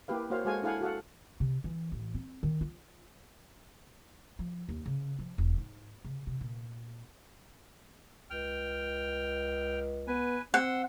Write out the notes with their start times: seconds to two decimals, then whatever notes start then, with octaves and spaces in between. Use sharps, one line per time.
0.08 A#3 E4 G4 B4 F5
0.30 A#3 F#4 C5 C#5 F5
0.45 G#3 F#4 A4 C5 F5 G#5
0.62 D4 E4 A4 F5 F#5 G#5
0.81 F#4 A4 F5 F#5
1.40 C3
1.64 E3
1.92 A1
2.15 C4
2.43 D#3
2.61 F4
4.39 F3
4.69 D#2
4.86 C#3
5.19 F3
5.38 E1
5.58 G#2
6.05 C#3
6.27 C3
6.41 A#2
8.30 C#2 G5 F6
10.07 B3 B4 G#5
10.54 C4 F#5 C6 E6